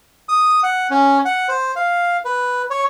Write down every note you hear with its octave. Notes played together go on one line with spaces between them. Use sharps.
D#6
F#5
C#4
F#5
C5
F5
B4
C#5